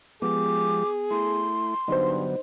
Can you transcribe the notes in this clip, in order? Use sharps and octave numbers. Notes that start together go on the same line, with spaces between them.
F3 G#3 B3 G4 G#4 D6
A3 E4 C6
G2 D3 F#3 B3 D#4 C5